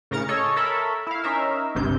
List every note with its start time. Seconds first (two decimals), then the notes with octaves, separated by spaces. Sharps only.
0.11 A2 C#3 A#4 A#5 A6 C#7
0.28 G#4 A4 C#5 D#5
0.56 A4 A#4 C#5 E5 B5
1.07 E4 F5
1.24 C#4 D#4 A#4 E5
1.75 G1 C#2 G2 C3 G6